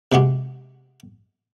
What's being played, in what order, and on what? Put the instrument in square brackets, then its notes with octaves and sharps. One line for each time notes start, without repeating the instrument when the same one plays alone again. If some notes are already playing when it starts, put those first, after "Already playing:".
[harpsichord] C3 G#3 F#4 G4